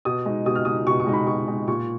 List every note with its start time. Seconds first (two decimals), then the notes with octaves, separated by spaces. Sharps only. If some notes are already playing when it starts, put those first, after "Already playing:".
0.05 B2 D#6
0.26 G#3 D#4
0.46 B2 D#6
0.55 F6
0.65 G#3 D#4 D#6
0.87 B2 C#6
1.00 C#6
1.07 G#3 D#4
1.14 B5
1.27 B2 C#6
1.47 G#3 D#4
1.68 A#2 C#6